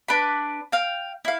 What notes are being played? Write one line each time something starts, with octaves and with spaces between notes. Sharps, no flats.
D4 B4 B5
F5 G5
E4 F5